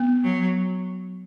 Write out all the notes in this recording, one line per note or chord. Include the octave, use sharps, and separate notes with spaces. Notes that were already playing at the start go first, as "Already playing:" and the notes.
Already playing: B3
F#3